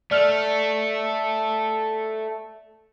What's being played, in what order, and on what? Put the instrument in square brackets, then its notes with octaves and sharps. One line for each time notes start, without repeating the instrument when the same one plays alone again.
[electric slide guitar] A3 [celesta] D5 F6 F7